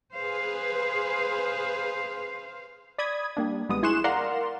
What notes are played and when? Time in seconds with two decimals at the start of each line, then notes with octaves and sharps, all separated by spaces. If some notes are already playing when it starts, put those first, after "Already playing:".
0.12 G#4 B4 C5 F5
2.98 D5 B5 D#6 G#6
3.37 G3 A#3 D4
3.69 A1 G3 G#3 B3 D#6
3.83 E4 G#4 C6 C#6 F#6 E7
4.04 A#4 D5 F5 F#5 A#5 C6